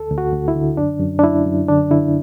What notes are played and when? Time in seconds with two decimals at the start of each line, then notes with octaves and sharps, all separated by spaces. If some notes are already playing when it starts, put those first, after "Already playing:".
Already playing: D2 A4
0.10 D2
0.18 F#4
0.32 D2
0.48 E4
0.55 D3
0.77 F#2 D4
1.00 F#2
1.19 D4
1.23 F#2 E4
1.46 F#2
1.69 D3 D4
1.91 D3 E4